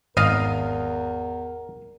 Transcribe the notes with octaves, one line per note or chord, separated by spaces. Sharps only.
G#1 E2 A#4 D#5 F5